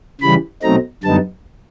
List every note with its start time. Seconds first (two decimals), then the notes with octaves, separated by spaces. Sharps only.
0.21 C#3 E3 G3 B5
0.62 B2 F#3 A3 C4 D#4 A#5
1.03 F#2 D3 G3 B3 D#4 A5